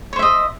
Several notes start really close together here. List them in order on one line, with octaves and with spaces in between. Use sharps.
C#5 C5 E5 D#5